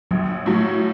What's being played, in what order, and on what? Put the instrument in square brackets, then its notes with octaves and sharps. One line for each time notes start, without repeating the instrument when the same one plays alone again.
[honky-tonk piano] A#1 [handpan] F#3
[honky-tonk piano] A2 F#3